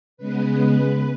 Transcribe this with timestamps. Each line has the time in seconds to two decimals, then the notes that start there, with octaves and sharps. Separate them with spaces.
0.17 C#3 G#3 B3 B4